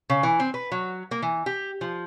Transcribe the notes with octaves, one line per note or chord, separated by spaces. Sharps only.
C#3
E3
C4
B4
F#3
A#3
E3
G4
F3